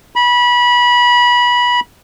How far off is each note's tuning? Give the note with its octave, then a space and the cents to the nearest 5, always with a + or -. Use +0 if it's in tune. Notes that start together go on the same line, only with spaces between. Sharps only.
B5 -25